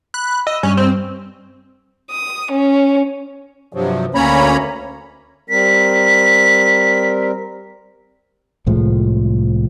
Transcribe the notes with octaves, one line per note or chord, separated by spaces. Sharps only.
B5 F#6
D#5 E6
G2 C#4
C4
D#6
C#4
G2 C3 F3 F#3
D2 A#3 C#4 C#5 A#5 B5
G3 C4 A#4 B6
C2 A2 F3 G#3